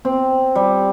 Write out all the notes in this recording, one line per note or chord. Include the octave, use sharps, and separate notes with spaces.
C4
G3